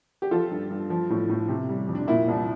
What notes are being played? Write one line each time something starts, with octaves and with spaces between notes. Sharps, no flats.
G4
F3 F4 A4
G2
G2
F3
A2
A2
C3
G3
F2
D4
A#2 E4
C2